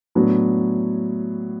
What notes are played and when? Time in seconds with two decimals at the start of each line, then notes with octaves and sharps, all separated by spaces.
0.15 A2 F#3 B3 D4